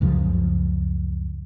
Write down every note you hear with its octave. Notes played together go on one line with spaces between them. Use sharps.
C#2 F#2 C#3 F3